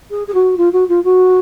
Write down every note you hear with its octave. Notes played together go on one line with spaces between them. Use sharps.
G#4
G#4
F#4
F4
F#4
F4
F#4